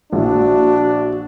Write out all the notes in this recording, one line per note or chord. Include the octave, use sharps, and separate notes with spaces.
A#1 D4 E4 F#4